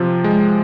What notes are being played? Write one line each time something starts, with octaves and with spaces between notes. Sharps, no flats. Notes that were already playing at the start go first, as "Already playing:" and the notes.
Already playing: C3 F3
G#3